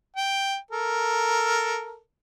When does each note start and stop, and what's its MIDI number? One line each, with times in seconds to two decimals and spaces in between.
0.17 0.57 79
0.71 1.99 69
0.71 1.99 70